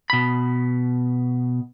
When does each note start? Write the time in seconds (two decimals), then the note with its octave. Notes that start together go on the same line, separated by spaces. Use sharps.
0.10 B2 B5